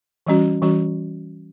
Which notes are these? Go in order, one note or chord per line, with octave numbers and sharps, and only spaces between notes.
E3 G3 C#4 F#4
E3 G3 C#4 F#4